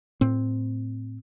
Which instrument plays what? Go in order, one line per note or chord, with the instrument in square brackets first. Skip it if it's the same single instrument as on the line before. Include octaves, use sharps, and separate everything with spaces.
[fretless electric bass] A2 C4